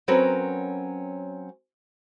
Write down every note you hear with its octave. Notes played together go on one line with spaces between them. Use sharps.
F#3 C4 C#4 A#4 B4